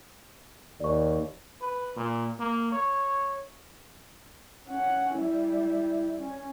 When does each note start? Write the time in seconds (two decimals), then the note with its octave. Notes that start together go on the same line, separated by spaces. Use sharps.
0.80 D#2 D5 C#6
1.62 B4
1.96 A#2
2.40 A#3
2.72 C#5
4.68 C#4 F#5
5.17 G3 E4
6.18 C#4